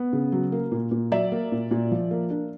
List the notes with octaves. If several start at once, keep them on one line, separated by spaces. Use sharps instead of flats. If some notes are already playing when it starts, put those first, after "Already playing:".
Already playing: B3
C#3
F#3
A#3
A#2
A#2
F#3 D5 E5
A#3
A#2
A#2
F3
A#3
D4